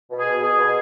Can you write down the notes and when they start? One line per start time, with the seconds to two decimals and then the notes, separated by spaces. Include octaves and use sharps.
0.10 B2
0.18 G#4
0.26 B2
0.42 B2 G#4
0.57 B2